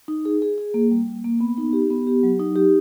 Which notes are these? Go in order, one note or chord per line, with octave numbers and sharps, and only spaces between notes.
D#4
G#4
G#4
G#4
A#3
G3
A#3
A#3
B3
D#4
G4
B3
G4
F#3
D#4
G4